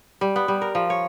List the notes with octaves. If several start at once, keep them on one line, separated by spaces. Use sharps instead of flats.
G3
B3
G3
A#4
F3
C#5